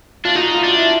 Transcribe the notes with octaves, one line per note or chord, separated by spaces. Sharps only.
D4 F4
D#4 F#4
F4
D4
E4